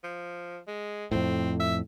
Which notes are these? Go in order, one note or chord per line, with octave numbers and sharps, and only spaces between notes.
F3
G#3
F2 A2 C4
E5